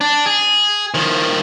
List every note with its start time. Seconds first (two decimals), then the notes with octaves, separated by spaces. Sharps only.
0.01 D4
0.26 G#4
0.94 D#3 F3